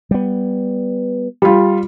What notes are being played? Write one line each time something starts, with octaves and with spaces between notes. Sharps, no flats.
G3 B3
G3 F4